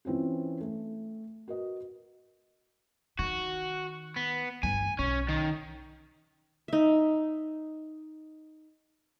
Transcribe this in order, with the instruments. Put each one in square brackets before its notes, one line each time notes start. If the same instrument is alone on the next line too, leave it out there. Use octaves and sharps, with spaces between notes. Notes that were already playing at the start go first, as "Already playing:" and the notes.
[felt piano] E3 C4 C#4 F4
A3
F#4 A#4 B4 D#5
[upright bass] D#3 [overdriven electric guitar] F#4
[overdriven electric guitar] B3
[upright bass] G1 G2 [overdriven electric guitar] G#5
[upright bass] B1 [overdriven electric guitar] C#4
[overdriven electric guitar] D#3
[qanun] D#4 E5